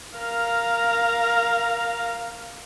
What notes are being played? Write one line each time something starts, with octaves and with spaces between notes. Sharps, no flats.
A#4 F5